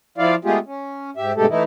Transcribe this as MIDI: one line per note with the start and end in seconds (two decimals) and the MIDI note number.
0.18 0.35 53
0.18 0.35 64
0.18 0.35 65
0.18 0.35 74
0.18 0.35 77
0.45 0.59 56
0.45 0.59 57
0.45 0.59 59
0.45 0.59 65
0.45 0.59 67
0.45 0.59 68
0.66 1.10 61
1.17 1.32 44
1.17 1.32 67
1.17 1.32 76
1.36 1.46 43
1.36 1.46 47
1.36 1.46 56
1.36 1.46 57
1.36 1.46 67
1.36 1.46 69
1.49 1.63 52
1.49 1.63 57
1.49 1.63 63
1.49 1.63 64